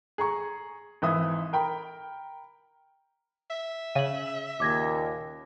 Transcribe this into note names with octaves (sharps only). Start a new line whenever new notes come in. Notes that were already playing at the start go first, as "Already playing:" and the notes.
G#4 A#5 C#6
G#1 E3 E5 D#6
A#4 G5 B5
E5
C#3 D#7 F#7
D#2 A#2 D6 G#6 A#6